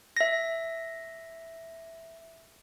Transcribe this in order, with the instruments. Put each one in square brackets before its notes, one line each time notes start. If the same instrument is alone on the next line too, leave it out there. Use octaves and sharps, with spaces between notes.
[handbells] E5 A#6